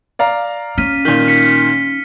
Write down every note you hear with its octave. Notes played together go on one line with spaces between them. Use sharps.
D5 F5 A#5
C#4 F6 B6 D#7
A#2 D#3 B6 G7
B6 C#7